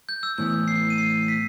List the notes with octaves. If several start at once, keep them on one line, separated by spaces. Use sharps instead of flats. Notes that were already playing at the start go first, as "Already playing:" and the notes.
G6
E6
A2 E3 B3 G6
C7
D#7
C7
B6